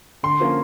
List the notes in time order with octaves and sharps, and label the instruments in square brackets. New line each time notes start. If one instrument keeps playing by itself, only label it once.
[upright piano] D3 [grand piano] C6
[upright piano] F3 A#3 C#4 F4